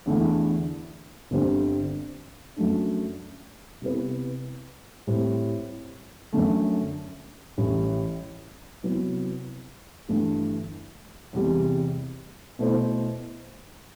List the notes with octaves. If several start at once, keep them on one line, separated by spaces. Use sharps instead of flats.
E2 D3 A3 E4
G1 G2 D3 G3 C4
F#2 F#3 A3 D4
C3 G3 B3 E4 B4
A2 G3 C4
F#2 D3 A3
A1 A2 G3
C3 F#3 B3 E4
G1 G2 E3 A3
E2 C3 G3
B2 A3 E4 A4 C5